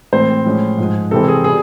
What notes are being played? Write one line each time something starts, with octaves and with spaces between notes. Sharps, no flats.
A2 E3 G#3 C4 C5
A2 F3 G#3 C#4
G#2 F3 G#3
C3 E3 G#3 C4 A4
G#4
B2 G3 G#4